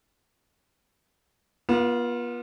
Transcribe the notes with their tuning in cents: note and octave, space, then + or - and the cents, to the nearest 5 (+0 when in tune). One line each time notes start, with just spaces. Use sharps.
B3 -40 F4 +0